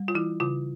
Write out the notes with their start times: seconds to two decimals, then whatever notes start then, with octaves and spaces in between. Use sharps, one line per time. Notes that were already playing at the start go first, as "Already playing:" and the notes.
Already playing: G3
0.08 F4
0.15 E3 E4
0.40 C#3 F4